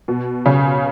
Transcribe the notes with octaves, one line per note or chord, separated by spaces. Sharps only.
B2
C#3 C#4